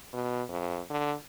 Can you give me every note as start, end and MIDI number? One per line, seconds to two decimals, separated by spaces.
0.13 0.43 47
0.49 0.80 41
0.90 1.14 50